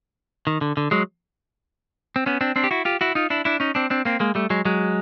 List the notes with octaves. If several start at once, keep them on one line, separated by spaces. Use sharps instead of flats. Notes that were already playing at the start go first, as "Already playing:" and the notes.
D#3
D3
D3
F#3 G#3
C4
B3 C#4
C4 D4
C4 D4
G4
E4 F#4
F4 G4
E4 F#4
D#4 F4
D4 E4
D4 E4
C#4 D#4
C4 D4
C4 D4
A#3 C4
G#3 A#3
G3 A3
F#3 G#3
F#3 G#3